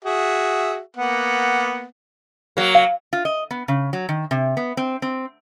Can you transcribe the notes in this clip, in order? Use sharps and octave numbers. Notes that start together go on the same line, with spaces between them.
F#4 G#4 E5
A#3 B3 F#5
F#3 A#3
F5
F4
D#5
B3
C#3
F#3
D#3
C3
B3
C4
C4